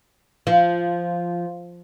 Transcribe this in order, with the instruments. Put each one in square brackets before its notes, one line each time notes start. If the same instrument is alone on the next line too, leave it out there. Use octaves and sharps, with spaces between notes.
[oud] F3